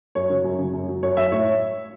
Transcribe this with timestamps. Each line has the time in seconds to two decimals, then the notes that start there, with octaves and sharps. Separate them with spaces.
0.15 F#2 C#5
0.30 C#3 F#3
0.44 F#2
0.58 C#3 F#3
0.74 F#2
0.88 F#3
1.03 F#2 C#5
1.17 F#3 E5
1.32 A2 C#5